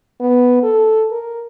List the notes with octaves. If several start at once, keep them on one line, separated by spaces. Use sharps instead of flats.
B3
A4
A#4